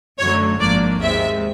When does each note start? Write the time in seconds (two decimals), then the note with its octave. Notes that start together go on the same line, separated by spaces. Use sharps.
0.18 F#2 D3 F#3 A3 C#5
0.58 G#1 G#2 F3 A#3 D4 D5
0.99 D#2 D#3 G#3 C4 E5